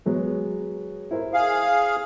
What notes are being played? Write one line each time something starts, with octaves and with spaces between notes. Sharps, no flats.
F#3 G#3 B3
E4 A#4 C5
G#4 F5